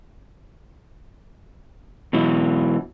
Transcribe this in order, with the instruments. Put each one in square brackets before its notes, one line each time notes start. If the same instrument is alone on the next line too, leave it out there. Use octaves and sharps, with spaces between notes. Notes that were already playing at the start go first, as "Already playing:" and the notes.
[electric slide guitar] B2 E3 F#3